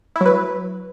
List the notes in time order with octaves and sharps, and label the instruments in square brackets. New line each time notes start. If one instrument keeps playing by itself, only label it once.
[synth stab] E4
F#3
B4